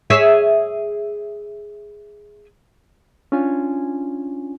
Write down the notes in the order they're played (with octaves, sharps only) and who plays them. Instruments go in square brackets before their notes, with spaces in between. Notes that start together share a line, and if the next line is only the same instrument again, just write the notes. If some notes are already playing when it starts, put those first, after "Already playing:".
[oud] G#4 C#5 E5
[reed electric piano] C#4 D4 F4 G#5